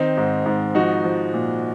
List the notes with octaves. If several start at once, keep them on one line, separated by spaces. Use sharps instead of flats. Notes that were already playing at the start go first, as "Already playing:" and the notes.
Already playing: D#3 C4 D#4
G#2
G#2
F3 D#4 F#4
F3
A#2